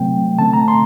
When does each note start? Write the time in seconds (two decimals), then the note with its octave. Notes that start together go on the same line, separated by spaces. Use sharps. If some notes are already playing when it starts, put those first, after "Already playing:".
Already playing: C3 F#3 A3 C4 G5
0.39 D3 A3 C4 A5
0.53 A#5
0.68 C6